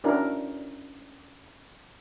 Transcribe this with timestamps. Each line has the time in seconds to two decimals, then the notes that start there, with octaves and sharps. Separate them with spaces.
0.04 C#4 D4 E4 F#4 A#4